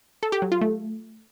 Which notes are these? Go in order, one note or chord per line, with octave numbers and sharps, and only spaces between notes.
A4
G4
F#3
F4
A3